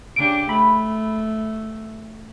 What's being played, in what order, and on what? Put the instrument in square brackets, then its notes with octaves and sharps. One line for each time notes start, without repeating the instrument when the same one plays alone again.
[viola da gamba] C#3 D4 G4 [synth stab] D7
[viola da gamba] A3 [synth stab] B5